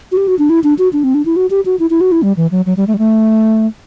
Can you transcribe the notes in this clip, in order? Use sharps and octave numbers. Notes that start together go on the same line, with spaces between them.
F#4
G4
F#4
D4
E4
D4
F#4
D4
C4
D4
E4
F#4
G4
F#4
E4
E4
F#4
E4
G3
E3
F#3
F#3
G3
A3
G3
A3